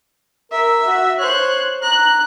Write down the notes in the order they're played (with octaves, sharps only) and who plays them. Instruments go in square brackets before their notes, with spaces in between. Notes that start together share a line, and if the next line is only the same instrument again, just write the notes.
[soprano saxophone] A#4 [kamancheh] E5
[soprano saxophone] F#4
[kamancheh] C5 F#6 [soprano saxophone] C#5
[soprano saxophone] A#5 [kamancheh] F#6